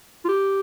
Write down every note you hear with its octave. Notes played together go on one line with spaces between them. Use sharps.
F4
G4